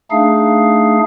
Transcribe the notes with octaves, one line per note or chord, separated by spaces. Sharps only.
A3 D4 D#4 G#4 F5